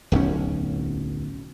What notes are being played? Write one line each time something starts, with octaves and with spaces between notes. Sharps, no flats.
D1 B1 E2 C#4